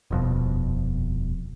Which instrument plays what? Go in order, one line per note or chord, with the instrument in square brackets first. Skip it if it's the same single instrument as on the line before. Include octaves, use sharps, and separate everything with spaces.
[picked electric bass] D#1 F2 B2